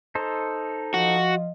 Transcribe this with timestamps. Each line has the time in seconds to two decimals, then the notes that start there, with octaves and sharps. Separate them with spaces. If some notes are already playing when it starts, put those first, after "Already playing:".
0.15 D#4 A4 C5
0.94 F3 F4 F#4 D#5